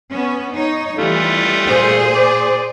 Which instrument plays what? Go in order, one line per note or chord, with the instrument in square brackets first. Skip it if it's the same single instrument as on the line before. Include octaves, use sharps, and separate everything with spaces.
[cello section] B3 C#4
D#4 C#5
[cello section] E3 [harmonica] G3 A3 F4
[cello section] A#2 G#4 C5
[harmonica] D5